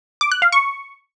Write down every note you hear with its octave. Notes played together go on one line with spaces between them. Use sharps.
D6
F#6
F5
C#6